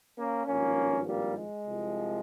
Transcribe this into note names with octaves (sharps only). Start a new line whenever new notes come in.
A#3 C#4
G#1 G2 F3 A#3 C#4
G3 A#3
G#3
C2 C3 F3